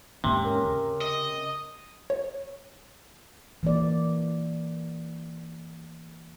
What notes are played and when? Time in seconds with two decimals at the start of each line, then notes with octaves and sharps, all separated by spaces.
0.24 D#2 G#2 C3 A#3
0.42 C#4 A#4
0.65 C#3
1.01 D#5
2.10 C#5
3.63 E3 A#3 D5